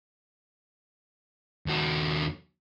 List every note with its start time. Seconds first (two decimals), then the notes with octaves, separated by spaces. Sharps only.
1.66 D#2 F#4